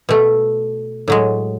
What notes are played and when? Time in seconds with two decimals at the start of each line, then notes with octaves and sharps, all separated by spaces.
0.09 B2 A3
1.08 A2 F#3 G#3